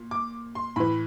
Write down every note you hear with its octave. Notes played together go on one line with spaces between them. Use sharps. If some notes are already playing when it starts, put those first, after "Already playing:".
Already playing: A#2
D6
C6
A2 E3 B5